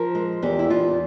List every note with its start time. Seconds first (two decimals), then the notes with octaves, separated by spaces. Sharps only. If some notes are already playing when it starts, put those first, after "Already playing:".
Already playing: F3 A#4
0.15 G#3
0.42 E2 G4
0.59 E4
0.70 E2 F4